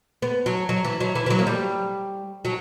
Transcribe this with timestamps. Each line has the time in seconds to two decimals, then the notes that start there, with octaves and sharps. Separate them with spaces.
0.22 B3
0.46 F#3
0.69 F#3
0.85 E3
1.00 F#3
1.15 E3
1.26 E3
1.30 F#3
1.39 A#3
1.47 G3
2.45 F#3